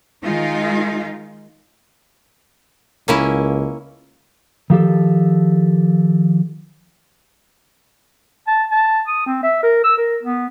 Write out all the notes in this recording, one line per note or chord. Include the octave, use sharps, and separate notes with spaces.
D#3 G#3 D#4 F4
C#2 A#3 C#4 E4
D#3 F3 G4 A4
A5
A5
D#6
C4
E5
A#4
E6
A#4
B3